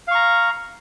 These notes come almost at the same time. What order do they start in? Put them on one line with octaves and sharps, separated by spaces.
F5 C#6 A#5